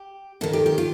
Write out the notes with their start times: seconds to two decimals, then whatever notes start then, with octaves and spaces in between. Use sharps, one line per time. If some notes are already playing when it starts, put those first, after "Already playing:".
Already playing: G4
0.41 D#2 D#3 A4
0.53 G4
0.66 G4
0.78 F4